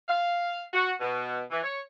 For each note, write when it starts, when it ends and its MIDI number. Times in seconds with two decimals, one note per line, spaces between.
0.09 0.62 77
0.74 0.92 66
1.01 1.43 47
1.51 1.62 52
1.64 1.81 73